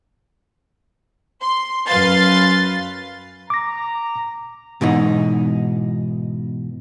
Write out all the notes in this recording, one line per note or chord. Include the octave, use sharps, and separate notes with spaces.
C6
F#2 B4 F5 C6 A6
A#5 D6 A#6
G#2 B2 E3 D#4